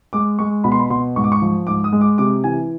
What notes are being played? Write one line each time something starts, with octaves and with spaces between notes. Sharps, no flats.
G#3 D6
G#3 C#6
B2 B5
C6
B5
B2 C6
G#2 C#6
D6
C#6
F3
G#2 D6
D#6
G#3
D6
C3 D6
E3 G#5